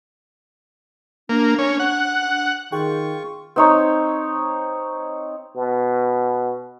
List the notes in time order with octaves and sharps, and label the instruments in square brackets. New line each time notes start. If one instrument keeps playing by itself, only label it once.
[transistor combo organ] A#3 [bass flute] D4
[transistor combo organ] C#4
F#5
[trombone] D#3 [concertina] F4 C#6 [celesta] G#4 [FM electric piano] G5
[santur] C4 D#4 C#5
[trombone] B2